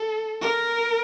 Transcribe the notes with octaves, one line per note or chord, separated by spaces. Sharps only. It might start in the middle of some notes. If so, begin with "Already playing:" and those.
Already playing: A4
A#4